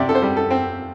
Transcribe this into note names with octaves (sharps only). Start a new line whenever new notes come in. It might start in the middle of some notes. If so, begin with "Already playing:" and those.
Already playing: C3 D5 E5
A4
C5
G3
A4
C4